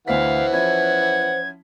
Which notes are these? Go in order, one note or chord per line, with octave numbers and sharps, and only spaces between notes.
D2 E3 C5 F5 F#5 B6
F3 C#4 E4 G#6